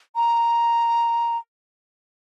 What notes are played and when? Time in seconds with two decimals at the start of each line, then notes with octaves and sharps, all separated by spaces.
0.16 A#5